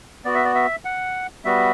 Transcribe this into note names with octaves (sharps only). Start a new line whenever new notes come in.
B3 F#4 D5
E5
D5
E5
F#5
G3 B3 F#4 E5